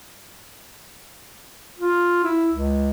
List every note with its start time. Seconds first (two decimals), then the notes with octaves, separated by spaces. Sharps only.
1.79 F4
2.24 E4
2.51 C#2